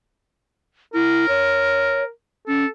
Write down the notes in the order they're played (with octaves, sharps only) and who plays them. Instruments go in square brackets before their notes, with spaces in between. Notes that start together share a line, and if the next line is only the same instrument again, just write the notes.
[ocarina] E4 [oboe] A#4
[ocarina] C#5
[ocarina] C#4 [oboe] A4